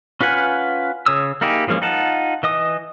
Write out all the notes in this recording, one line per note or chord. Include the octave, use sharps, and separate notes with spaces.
C#4 F4 B4 F#5 G#5
C#3 C#5 D#6 E6
A#3 D#4 E4 G4 G#4
E3 F3 G#3 A#3 C#4
D#4 F4 F#5 A5
E3 D#5 D#6